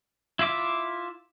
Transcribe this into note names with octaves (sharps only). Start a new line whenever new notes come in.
E4 F4 E5 D6